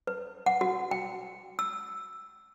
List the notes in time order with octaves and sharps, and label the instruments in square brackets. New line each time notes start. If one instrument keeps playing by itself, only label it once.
[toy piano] B4
F#5
F#4
G5
E6